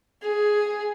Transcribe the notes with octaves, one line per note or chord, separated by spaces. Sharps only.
G#4